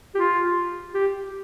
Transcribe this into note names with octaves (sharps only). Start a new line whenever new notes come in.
G4
F4
G4